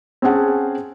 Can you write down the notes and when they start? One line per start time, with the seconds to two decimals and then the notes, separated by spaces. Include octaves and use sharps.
0.22 C4 C#4 G#4 F#5 A5